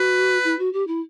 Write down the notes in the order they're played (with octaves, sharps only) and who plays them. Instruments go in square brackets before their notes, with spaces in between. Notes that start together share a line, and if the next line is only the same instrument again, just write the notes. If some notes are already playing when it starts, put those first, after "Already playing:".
Already playing: [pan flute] F#4 [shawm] B4
[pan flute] E4
F#4
G4
E4